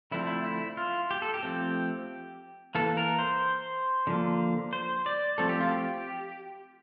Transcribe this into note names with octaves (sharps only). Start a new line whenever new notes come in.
D3 F3 A3 C4 E4
E4
E4
F4
G4
A4
G4
F3 A3 C4
E3 A#3 A4
A#4
C5
D3 F3 A#3
C5
D5
F3 A3 C4 A4
G4
F4
G4